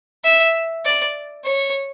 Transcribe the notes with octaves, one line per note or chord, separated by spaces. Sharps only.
E5
D5
C#5